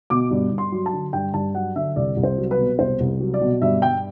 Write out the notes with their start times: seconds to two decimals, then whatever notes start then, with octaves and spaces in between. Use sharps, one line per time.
0.10 B2 D6
0.31 G2
0.51 G2
0.58 C6
0.72 F#3
0.86 A5
0.93 D3
1.13 G2 G5
1.34 G2 A5
1.55 F#3 F#5
1.76 D3 E5
1.96 C2 D5
2.16 C2
2.23 C5
2.37 F#3
2.51 B4
2.58 B2
2.79 C2 C5
3.00 C2
3.20 F#3
3.34 D5
3.41 B2
3.61 G2 E5
3.82 G2 G5